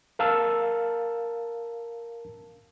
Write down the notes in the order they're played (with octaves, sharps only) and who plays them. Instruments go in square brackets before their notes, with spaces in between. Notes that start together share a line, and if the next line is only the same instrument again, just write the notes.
[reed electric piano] A#4 F5 A5 E6